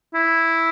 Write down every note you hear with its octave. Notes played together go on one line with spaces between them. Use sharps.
E4